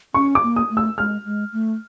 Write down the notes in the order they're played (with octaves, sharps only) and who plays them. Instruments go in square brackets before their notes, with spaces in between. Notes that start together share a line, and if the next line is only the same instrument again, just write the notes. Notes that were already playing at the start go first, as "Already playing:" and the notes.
[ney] C#4 [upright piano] C#6
[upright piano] D6
[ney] A#3
[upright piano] D#6
[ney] A3
[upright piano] E6
[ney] G#3 [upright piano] F6
[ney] G#3
A3